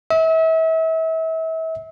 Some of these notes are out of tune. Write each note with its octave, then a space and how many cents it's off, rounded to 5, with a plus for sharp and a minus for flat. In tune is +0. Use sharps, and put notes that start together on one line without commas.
E5 -35